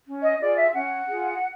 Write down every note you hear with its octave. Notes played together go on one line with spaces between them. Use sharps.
C#4
D#5
F4 G#4 D5
E5
C#4 F#5
F4 G#4